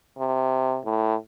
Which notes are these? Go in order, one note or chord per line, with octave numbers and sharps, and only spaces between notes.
C3
A2